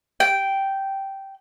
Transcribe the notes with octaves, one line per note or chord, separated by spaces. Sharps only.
G5